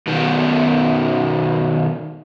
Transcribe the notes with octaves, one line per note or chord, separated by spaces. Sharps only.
B2 D#3